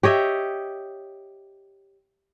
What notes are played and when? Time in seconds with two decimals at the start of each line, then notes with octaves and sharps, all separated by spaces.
0.03 G4 C#5 D#5 E5